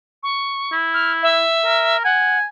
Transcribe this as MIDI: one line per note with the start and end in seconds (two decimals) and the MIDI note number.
0.23 0.74 85
0.73 1.44 64
0.94 1.12 89
1.23 1.97 76
1.65 2.01 70
2.04 2.38 78
2.04 2.45 80